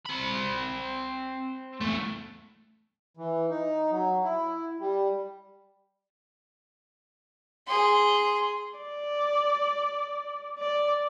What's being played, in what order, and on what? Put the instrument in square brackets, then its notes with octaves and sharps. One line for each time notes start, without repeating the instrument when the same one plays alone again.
[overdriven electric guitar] C4 B5
E2 A3
[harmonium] E3
D#4
F#3
E4
G3
[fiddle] G#4 C6
[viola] D5
D5